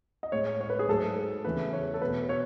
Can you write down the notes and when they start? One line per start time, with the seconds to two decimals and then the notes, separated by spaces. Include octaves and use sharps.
0.23 D#5
0.32 A2 G#3 C#5
0.61 C#5
0.70 B4
0.79 G#4
0.89 G#2 F#3 A3 A4
1.45 E2 C#3 E3 A3 B4
1.73 C#5
1.94 A4
2.01 B2 A3 B4
2.29 C#5